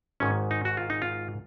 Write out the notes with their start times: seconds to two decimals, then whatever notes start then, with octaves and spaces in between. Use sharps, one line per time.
0.20 G#1 G#2 D#3 C#4
0.51 D#4
0.65 F#4
0.77 F4
0.90 D#4
1.02 F4